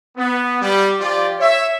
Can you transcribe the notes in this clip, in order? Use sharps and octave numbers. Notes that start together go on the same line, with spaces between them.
B3
G3
F3 F4 G4 D5
C#5 E5